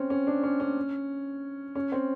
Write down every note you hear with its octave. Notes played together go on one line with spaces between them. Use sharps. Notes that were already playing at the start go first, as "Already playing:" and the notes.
Already playing: C4 C#4
C#4
D4
C#4
C#4
C#4
C4